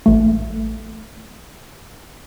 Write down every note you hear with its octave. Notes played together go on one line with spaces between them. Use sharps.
A1 A3